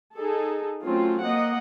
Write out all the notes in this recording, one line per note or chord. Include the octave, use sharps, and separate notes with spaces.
D#4 G#4 A4
F#3 A3 C4 C#4 F4
A#3 D#5 F#5